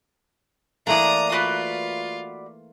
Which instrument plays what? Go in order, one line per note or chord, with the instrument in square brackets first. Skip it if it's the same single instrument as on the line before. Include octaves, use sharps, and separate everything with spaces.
[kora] E3 A3 A#3 [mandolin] D4 D5 [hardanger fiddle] A#5 D#6
[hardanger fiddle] F4 [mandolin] F#4 B4 D5